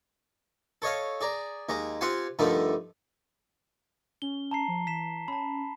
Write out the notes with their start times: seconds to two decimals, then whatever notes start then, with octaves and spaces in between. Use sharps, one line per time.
0.82 A4 C#5 D#5 F5
1.21 G#4 D5 A#5
1.69 D#2 G#3 A#5
2.01 C4 F4 G4 F#5 G#5 C6
2.39 G2 D3 D#3 F3 A3
4.22 C#4 G7
4.51 A5 A#5 C7
4.68 F3
4.87 E3 B6 E7
5.28 C#4 A5 B5